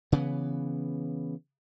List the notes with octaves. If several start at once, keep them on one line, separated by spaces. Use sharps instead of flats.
C#3 E3 B3